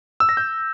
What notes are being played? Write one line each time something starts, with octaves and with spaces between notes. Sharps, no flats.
E6
A#6
G6